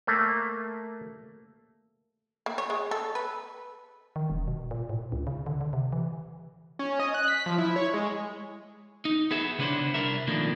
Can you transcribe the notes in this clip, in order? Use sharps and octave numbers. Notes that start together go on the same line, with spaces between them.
A3 A#3
A#3
C#5
G#3
A4
B4
D#3
E1
B2
A#2
A2
C#2
C#3
D3
D3
C3
E3
C#4
D#5
F#6
B6
F3
E4
C#5
G#3
D#4
B3 G#4 E5
C#3 B3 D4 E4 C5
C2 C#3 D4 E4 A#4 E5
B2 D#3 F3 A3 A#3 D4